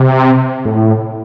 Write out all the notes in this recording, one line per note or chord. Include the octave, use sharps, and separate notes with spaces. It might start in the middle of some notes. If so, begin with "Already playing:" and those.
Already playing: C3
A2